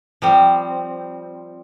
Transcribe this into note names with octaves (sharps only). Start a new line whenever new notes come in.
F3 G3 C4